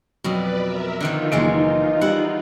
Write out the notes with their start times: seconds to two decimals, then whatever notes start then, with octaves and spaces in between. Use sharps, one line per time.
0.24 F2 B2 F#3 B4 D5
0.61 A#4 E5
1.00 D3 D#3 F3 D#4 F4
1.32 F#1 D#3 E3 G#3 D7
2.01 G3 E4 F#5